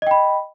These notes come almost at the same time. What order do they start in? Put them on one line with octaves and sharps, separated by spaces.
D#5 G5 B5